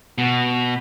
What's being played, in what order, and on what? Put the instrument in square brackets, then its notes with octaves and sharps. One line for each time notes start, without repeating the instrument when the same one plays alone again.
[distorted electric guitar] B2